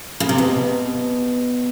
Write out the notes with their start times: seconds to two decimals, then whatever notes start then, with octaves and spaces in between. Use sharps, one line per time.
0.20 C#3
0.29 C3
0.38 B2